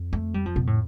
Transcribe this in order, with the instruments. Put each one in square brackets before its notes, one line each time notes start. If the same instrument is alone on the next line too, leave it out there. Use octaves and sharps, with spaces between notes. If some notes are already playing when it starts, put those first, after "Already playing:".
Already playing: [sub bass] F2
[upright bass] A3
G3
F3
B2
A2